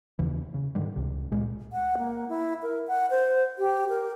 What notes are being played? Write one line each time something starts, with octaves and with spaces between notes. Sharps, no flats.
D#2 C#3 E3
C#3
G#2 D3 D#3 G3
C#2 C3
C#2 A#2 G#3
F#5
A#3
E4
A#4
F#5
C5
G4
A#4